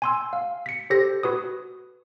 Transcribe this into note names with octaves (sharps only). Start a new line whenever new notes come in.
G#5 C6 E6
F5
B6 C#7
G4 A4 C5 A#6
F#4 B4 D#6